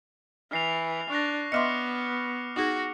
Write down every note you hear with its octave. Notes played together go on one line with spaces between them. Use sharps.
E3 F6 C7 F7
D4 C#6 F#6 A#6
B3 D#5 E5 C6 D6 F6 C#7
D#4 F#4 G#4